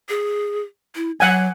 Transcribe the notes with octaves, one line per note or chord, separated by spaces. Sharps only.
G#4
E4
F#3 F#5 G#5